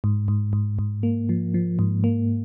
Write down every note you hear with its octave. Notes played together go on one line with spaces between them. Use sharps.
G#2
G#2
G#2
G#2
A#3
F3
F3
G#2
A#3